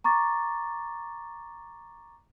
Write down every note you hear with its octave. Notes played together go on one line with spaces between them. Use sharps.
A#5 C#6 D6 A6